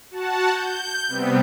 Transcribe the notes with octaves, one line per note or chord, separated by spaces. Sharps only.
F#4 F#5 A5
G6
C3 G3 B3 C4